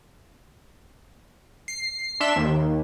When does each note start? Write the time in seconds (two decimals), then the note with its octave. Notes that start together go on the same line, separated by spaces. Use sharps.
1.68 C7
2.20 D4 E5 C6 E7
2.36 D#2